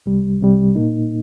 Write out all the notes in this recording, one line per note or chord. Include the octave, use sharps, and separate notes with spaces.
C2 C3 G3
C2 C3 G3
A#2 A#3 D#4